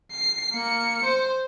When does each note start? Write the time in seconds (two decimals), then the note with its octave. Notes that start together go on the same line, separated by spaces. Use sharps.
0.11 C7
0.53 A#3 C#7
1.05 C5